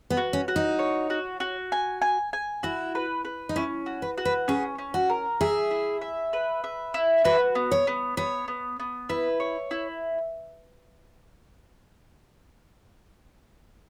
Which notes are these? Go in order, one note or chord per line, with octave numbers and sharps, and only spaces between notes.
B3
F#4
C#4
F#4
D#4
C#5
F#4
F#4
G#5
G#5
G#5
E4 F#4
B4
B4
D#4
C#4 E4
F#4
B4
F#4
B4
C#4 G#4
C#4
F#4
A#4
G#4 E5
E4
E5
B4
E5
E4
F#4 B4
B3
C#5
B3
B3 C#5
B3
B3
E4 B4
C#5
E4